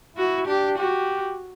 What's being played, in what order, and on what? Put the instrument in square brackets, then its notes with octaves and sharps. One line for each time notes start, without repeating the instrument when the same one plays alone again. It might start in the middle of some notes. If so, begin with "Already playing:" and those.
[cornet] E4 [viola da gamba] F#4
[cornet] D4 [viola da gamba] G4
[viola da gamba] F#4 [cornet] G4